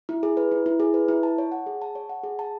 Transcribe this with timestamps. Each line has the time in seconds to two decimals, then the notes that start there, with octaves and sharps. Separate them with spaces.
0.09 E4
0.23 G#4
0.37 B4
0.52 E4
0.66 E4
0.80 G#4
0.94 B4
1.08 E4
1.23 A5
1.38 C#5
1.52 F#5
1.66 G#4
1.82 A5
1.95 C#5
2.09 F#5
2.24 G#4
2.39 A5